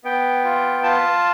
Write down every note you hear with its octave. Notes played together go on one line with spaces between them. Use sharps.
B3 G5
F4
F4 A5